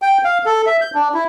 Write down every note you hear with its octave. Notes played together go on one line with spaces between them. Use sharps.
G5
F5
A4
E5
G6
D4
E4